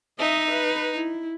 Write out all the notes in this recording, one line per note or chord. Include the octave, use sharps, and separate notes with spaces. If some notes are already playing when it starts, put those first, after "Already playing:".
D#4 D#5 E5
B4
E4